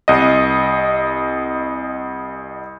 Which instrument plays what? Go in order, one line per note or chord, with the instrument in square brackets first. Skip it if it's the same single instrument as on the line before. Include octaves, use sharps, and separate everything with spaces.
[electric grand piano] C2 D#5